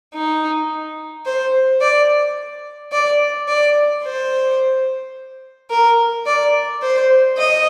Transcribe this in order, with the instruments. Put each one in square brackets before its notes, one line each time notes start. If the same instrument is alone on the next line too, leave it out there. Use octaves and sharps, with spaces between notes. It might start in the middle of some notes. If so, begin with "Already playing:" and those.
[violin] D#4
C5
D5
D5
D5
C5
A#4
D5
C5
D#5